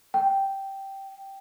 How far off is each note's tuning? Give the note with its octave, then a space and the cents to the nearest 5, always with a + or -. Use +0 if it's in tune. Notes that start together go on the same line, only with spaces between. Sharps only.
G5 -5